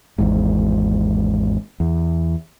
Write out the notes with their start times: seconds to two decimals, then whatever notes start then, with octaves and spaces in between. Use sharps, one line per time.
0.18 G#1 E2 G#2
1.80 E2